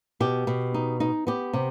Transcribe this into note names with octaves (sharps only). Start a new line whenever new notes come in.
B2 G4
B2
D#4
D#4
B3 G4
C3